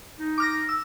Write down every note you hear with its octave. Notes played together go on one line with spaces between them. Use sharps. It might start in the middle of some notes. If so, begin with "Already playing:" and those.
D#4
D6 F6 A#6
E6